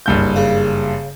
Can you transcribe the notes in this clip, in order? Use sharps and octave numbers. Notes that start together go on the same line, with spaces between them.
F#1 G2 G6
C#3